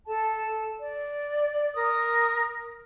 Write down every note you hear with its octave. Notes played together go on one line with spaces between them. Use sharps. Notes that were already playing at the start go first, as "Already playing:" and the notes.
A4 A5
D5
A#4 D#6